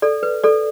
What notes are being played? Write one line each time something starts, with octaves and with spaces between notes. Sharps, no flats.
A4 D5
B4
A4 D5